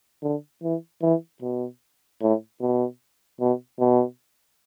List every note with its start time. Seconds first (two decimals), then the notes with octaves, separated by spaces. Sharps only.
0.23 D3
0.63 E3
1.02 E3
1.42 B2
2.21 A2
2.61 B2
3.40 B2
3.79 B2